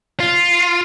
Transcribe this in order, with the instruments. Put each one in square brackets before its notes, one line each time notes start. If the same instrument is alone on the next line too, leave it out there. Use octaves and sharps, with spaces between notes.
[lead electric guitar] F4